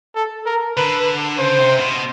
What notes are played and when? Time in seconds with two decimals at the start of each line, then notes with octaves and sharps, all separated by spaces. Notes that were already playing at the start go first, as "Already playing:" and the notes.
0.15 A4
0.46 A#4
0.77 D3 B4
1.38 C#3 C5
1.59 C3
1.80 B2